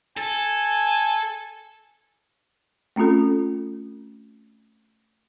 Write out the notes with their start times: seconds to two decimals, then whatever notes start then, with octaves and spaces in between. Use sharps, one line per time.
0.17 A4 G#5
2.96 A3 C4 C#4 F4 A4